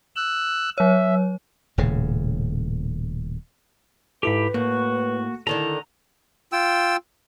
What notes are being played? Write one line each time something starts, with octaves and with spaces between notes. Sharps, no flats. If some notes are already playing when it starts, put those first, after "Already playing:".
E6 F#6
F#3 C#5 E5
D#1 A2 C#3
G#2 E4 G4 A4 B4 B5
A2 A#3 F#4
D3 D#3 E4 A4 A#5
F4 G5 E6